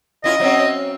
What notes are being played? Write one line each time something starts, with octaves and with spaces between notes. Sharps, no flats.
F#2 E4 F4 D#5
F#3 C4 C#4